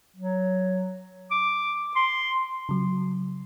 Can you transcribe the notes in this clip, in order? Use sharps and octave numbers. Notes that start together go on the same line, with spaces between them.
F#3
D6
C6
C#3 F#3